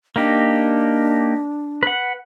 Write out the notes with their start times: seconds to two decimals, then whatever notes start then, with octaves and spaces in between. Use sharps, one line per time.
0.16 A#3 D4 D#4 G4
1.83 B4 F#5